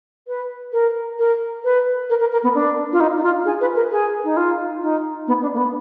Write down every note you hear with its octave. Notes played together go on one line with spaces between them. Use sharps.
B4
A#4
A#4
B4
A#4
A#4
A#4
B3
D4
F4
D#4
D#4
F4
G#4
B4
A#4
G#4
D#4
F4
D#4
B3
D4
A#3
B3